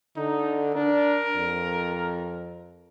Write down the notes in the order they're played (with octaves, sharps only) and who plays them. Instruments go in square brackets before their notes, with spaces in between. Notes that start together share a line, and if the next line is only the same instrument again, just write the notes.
[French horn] D3 [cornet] D#4
[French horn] D4 [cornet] A#4
[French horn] F2